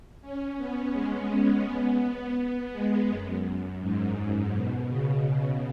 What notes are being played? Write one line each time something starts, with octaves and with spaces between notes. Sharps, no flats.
C#4
B3
G#3
B3
B3
G#3
F#2
G#2
B2
C#3